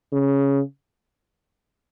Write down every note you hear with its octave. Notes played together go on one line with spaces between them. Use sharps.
C#3